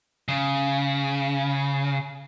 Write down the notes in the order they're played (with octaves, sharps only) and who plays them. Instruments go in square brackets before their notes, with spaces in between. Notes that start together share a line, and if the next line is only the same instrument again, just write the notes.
[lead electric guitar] C#3